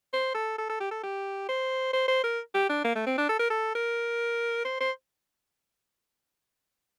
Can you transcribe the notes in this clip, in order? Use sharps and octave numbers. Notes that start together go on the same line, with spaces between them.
C5
A4
A4
A4
G4
A4
G4
C5
C5
C5
A#4
G4
D4
A#3
A3
C4
D4
A4
A#4
A4
A#4
C5
C5